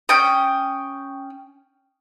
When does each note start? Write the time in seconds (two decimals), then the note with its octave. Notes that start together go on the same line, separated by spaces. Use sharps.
0.09 C#4 G5 D#6